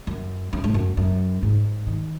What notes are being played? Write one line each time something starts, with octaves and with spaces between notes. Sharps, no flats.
F#2
F#2
G#2
F#2
F#2
G#2
D#3